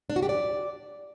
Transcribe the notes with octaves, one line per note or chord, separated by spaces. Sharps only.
D4
F#4
G4
D5